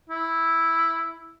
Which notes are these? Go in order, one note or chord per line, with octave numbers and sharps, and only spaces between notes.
E4